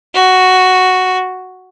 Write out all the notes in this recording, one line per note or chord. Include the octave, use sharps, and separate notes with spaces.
F#4